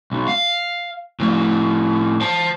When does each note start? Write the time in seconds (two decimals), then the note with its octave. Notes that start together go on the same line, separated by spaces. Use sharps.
0.11 B1
0.28 F5
1.20 A2 F3
2.21 C5 A5